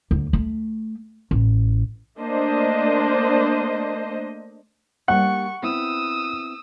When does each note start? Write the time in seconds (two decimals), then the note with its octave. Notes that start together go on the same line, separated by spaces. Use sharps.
0.11 D2
0.33 A3
1.31 A1
2.19 A3 A#3 D4 C5 D#5
5.08 G3 A#3 D4 F#5 C#6
5.63 B3 C4 E4 D#6 E6